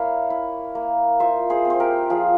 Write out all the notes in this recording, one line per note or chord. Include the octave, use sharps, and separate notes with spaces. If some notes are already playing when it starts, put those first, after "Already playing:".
Already playing: A#3 E4 C#5 F5
E4
A#3
F4 C5 E5
G#4 C5
C4
C5
G4 A#4
F3 F4 G#4